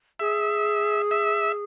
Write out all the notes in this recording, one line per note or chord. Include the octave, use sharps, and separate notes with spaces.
G#4 E5
E5